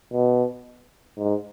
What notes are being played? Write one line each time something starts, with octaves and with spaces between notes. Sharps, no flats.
B2
G#2